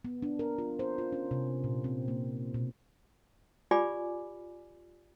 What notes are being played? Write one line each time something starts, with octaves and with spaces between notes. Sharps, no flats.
B3
D4
A#4
F4
C5
F4
C#4
C3
A#2
C4
A#3
B2
F4 G4 D5 G#5 B5 D6